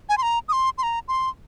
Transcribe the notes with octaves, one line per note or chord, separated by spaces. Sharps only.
G#5
C6
A#5
D#6
C6
C6
A#5
C6